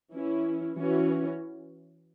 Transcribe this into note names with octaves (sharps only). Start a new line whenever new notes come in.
E3 C#4 E4
E3 C#4 F#4